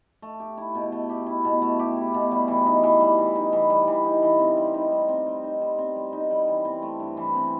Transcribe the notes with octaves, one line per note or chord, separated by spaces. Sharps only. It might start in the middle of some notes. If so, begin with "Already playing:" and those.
A3
G4
E4
B2
A3
G4
E4
B2
A3
G4
E4
B2
G3
E3
D#4
E3
G3
E3
D#4
E3
G3
E3
D#4
E3
C4
G3
D#4
G3
C4
G3
D#4
G3
C4
G3
D#4
G3
E3
C4
A3
G2
E3
C4